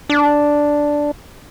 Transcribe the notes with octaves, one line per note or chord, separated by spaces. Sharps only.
D4